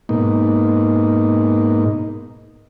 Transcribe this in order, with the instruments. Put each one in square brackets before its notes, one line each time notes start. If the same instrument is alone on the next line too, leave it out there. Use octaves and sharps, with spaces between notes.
[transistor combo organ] G#2 B2 A#3 D#4